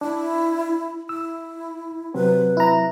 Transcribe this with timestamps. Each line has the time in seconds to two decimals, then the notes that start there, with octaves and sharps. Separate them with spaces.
0.01 D4 E4
1.09 E4 E6
2.14 C3 F#3 C4 B4
2.57 E4 A#5